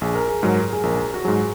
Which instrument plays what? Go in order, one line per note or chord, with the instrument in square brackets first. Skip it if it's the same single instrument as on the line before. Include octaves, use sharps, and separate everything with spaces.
[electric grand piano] A#1 [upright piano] G#4
[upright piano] A#4
G#4
[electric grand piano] G#2 F#3 [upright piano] A#4
[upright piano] G#4
[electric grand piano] A#1 [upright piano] A#4
[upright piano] F#4
[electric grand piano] G#2 F#3 [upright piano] G#4